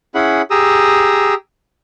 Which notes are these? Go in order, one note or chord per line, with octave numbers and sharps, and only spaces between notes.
C#4 E4 G#4 F#5 B5
G4 G#4 A#5 D#6 E6